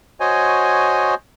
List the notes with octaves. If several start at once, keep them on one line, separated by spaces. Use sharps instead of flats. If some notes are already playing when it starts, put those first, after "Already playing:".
F#4 C5 C#5 D#5 G#5